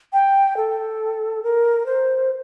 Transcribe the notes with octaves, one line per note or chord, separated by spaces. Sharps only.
G5
A4
A#4
C5